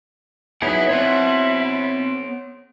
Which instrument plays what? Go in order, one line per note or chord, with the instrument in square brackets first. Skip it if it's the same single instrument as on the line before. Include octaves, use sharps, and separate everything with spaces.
[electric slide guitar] B3 D#4 G#4 [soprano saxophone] E4 [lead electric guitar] C#5 F#5
[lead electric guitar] B3 C#5 [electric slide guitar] C4 C5 F#5